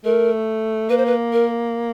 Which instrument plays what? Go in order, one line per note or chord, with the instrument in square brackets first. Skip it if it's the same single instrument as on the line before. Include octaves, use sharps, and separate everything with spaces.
[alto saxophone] A3 [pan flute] A#4
[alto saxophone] A#3 [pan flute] B4
[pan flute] C5
B4
A#4